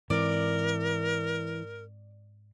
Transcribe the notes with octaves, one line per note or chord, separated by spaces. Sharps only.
G#2 E3 C4 A#4 D5